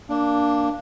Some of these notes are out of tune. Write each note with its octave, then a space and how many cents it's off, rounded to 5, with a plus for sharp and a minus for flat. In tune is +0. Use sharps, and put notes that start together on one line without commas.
A#3 -10 D4 +0